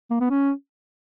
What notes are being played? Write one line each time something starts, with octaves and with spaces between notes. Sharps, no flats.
A#3
B3
C#4